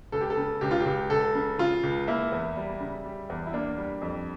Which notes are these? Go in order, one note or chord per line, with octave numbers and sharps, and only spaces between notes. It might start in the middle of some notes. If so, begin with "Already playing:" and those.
C#2 A4
G4
A4
C#3
C#2 G4
F4
G4
C#2
C#2 A4
C#3
C#3 F4
C#2
A#3 E4
E2
G3
C#3
G3
E2
E4
A#3 D4
G3
F2